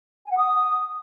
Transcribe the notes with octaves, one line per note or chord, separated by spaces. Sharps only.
G#5
F#5
D#6